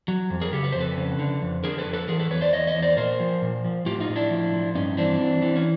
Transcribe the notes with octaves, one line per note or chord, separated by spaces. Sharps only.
F#3
F2
G#4 A#4
C#3 G4 A4
B4
F2 C5
A4 B4
C#3
D3
F2
D3 G#4 A#4
A4 B4
F2
A4 B4
E3 G#4 A#4
A4 B4
E2 B4 C#5
C5 D5
E2 C#5 D#5
C#5 D#5
E2
C5 D5
A#2 A#4 C5
F3
A#2
F3
A2 F4 G4
D#4 F4
A2
D4 E4
F3
F3
G2 C#4 D#4
E3 C4 D4
E3
E3
C#4